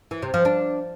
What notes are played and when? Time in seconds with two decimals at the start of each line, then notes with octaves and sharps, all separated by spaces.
0.11 E3
0.22 C3
0.34 F3
0.45 D4